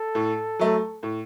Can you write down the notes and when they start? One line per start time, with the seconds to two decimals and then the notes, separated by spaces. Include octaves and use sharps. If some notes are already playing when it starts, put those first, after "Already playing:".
Already playing: A4
0.15 A2
0.59 F#3 A3
1.03 A2